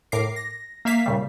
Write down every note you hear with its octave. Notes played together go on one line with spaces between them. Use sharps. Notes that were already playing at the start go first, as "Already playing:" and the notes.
A2 A#4 D6 C7
A#6
A#3 E5 F5 B6 C7
A#2 C#3 G3